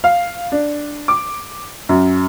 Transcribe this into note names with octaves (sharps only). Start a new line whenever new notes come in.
F5
D4
D6
F#2